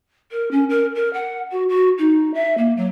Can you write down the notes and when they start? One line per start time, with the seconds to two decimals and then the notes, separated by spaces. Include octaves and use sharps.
0.31 A#4
0.51 C#4
0.69 A#4
0.95 A#4
1.13 F#5
1.52 F#4
1.69 F#4
1.98 D#4
2.34 E5
2.58 A#3
2.77 F#3